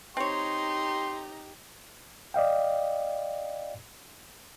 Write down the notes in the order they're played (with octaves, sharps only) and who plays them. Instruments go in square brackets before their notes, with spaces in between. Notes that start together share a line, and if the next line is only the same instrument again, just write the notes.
[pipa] C4 C#5 [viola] D#4 A#5 [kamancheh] G4 [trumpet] C6
[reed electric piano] D5 D#5 F5 G5